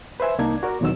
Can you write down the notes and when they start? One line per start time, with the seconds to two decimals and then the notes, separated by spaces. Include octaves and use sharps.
0.20 B4 C5 E5 G#5
0.39 C2 A#3 D4 D#4 G#6
0.63 F#4 A#4 D5
0.81 E2 B2 D#3 F#3 E6